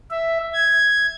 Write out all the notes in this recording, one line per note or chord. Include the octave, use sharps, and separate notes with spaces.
E5
G#6